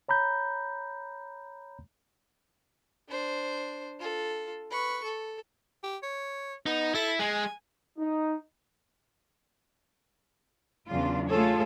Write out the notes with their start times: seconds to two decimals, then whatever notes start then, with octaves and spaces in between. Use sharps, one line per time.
0.09 C#5 A#5 B5 G6
3.08 D4 C5
3.99 F4 A4
4.70 B4 C#6
5.04 A4
5.83 G4
6.03 C#5
6.66 B3 D#4
6.94 E4 A4
7.19 G#3 G#5
7.97 D#4
10.88 E2 C#3 F#3 D4 F4
11.30 A3 F4 G#4 A4 C#5